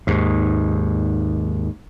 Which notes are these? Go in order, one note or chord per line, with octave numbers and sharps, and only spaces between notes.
D#2 G#2